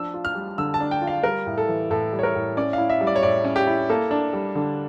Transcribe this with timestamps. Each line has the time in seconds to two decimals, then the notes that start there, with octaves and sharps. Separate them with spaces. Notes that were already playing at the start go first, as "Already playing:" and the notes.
Already playing: F3 D4 E6
0.14 F4
0.25 F6
0.35 G3
0.58 D3 E6
0.74 A5
0.80 D4
0.91 G5
1.01 F4
1.07 F5
1.23 G3 A#4
1.46 A2
1.58 A4
1.68 E3
1.90 A2 A4
2.13 G3
2.19 C#5
2.23 A#4
2.35 A2
2.57 C#4 D5
2.73 E4 F5
2.89 E5
3.01 G3
3.07 D5
3.16 C#5
3.23 A2 D5
3.44 C#4
3.56 G4
3.67 E4
3.89 A#3 A4
4.11 D4
4.33 G3
4.55 D3